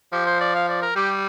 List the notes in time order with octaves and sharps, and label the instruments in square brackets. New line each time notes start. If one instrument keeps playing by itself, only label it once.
[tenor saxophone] F3 [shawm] G4
[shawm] C5
D5
F5
D5
A#4
[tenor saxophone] G3 [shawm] G4